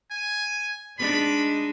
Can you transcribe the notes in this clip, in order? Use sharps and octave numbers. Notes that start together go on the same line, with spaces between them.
G#5
G#3 D4 D#4 B5